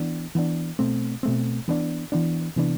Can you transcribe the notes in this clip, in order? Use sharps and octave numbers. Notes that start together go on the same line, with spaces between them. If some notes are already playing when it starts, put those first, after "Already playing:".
Already playing: E3 B3 D4
E3 B3 D4
B2 A3 C4
B2 A3 C4
E3 B3 D4
E3 B3 D4
C3 E3 B3 D4